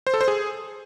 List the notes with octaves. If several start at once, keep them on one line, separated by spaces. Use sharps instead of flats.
C5
A4
C5
G#4